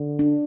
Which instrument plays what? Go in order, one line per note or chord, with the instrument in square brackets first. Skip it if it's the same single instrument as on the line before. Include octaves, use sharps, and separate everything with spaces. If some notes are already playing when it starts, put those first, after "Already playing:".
Already playing: [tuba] D3
[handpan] D4